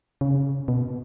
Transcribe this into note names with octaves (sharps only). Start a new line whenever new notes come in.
C#3
B2